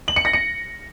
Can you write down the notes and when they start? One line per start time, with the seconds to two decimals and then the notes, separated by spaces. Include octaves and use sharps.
0.08 F#7
0.16 C#7
0.25 A#6
0.33 C#7